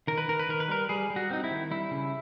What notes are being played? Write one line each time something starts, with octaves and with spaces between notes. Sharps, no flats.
D#3 A#4
B4
D#3 A#4
B4
D#3 A#4
B4
G3 A#4
G3 G#4
G3
F#4
C4 D#4
E4
D#3
G3 E4
C#3